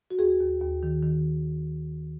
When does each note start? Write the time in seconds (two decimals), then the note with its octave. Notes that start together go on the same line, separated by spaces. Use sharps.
0.11 F#4
0.19 D#2 G#4
0.40 D#2
0.61 D#2
0.83 D#3
1.03 D#3